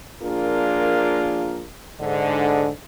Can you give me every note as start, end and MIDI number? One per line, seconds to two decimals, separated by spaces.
0.23 1.67 53
0.23 1.67 58
0.23 1.67 62
0.23 1.67 65
0.23 1.67 68
0.23 1.67 70
2.01 2.68 44
2.01 2.68 50